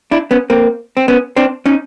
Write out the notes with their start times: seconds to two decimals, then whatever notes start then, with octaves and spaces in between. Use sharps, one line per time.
0.11 D4 E4
0.31 B3 C#4
0.50 A#3 C4
0.97 C4
1.08 B3 C#4
1.36 C4 D4
1.66 C#4 D#4